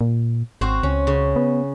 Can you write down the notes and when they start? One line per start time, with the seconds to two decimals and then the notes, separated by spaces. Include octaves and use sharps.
0.01 A#2
0.61 G#1 C4 F#4 C5
0.83 C#2 C#4
1.07 C#3
1.36 B3